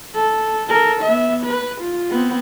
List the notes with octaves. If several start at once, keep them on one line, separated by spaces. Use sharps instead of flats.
A4
A4 A#4
B3 E5
B4
F4
B3 C4